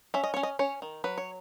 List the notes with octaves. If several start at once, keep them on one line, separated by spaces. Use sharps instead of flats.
C#4 E5
D#5
C#4 C#5
D#5
C#4 C#5
D#3
F#3 B4
C#5